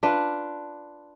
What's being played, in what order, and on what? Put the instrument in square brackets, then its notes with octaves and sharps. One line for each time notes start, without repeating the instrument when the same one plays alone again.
[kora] D4 F4 B4